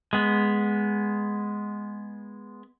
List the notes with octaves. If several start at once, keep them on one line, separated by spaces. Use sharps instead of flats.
G#3 B3